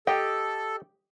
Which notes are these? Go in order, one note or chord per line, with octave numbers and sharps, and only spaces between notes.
G4 A4 D#5 G5